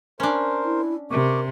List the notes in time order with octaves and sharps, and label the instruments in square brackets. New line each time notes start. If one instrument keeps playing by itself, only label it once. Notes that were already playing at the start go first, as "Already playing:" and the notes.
[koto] C#4 D4 [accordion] A#4 C5
[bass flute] E4
[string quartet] C3 [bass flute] A#4 [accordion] C#6 D6